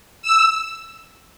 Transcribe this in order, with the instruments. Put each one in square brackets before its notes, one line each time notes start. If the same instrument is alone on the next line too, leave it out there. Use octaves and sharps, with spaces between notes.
[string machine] E6